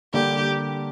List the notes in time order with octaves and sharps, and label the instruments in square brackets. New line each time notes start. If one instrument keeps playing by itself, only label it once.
[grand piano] D3 G3 A#3 D4 [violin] G4